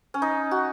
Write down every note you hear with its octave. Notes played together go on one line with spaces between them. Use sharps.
C#4
D#4
F#4